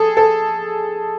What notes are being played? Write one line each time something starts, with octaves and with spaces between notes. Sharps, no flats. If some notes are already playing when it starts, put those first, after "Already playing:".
Already playing: G#4 A4
A4